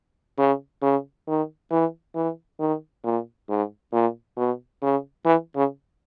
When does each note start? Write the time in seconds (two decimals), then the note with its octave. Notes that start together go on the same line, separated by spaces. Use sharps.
0.38 C#3
0.82 C#3
1.27 D#3
1.71 E3
2.15 E3
2.60 D#3
3.04 A#2
3.49 G#2
3.93 A#2
4.37 B2
4.82 C#3
5.25 E3
5.56 C#3